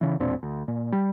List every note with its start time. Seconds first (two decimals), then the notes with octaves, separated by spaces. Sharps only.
0.01 C#3 E3
0.20 E1 A#2 C4 D4
0.43 D2
0.68 A#2
0.92 G3